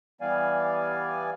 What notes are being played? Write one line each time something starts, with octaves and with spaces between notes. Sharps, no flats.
E3 G3 B3 D5 F5 G#5